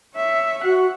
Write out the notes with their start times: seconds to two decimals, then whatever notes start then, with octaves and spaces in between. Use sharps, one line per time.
0.16 C#5 E5
0.64 F#4 F#5